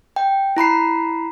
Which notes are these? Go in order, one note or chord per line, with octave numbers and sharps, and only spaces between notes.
G5
E4 A#5 B5 C7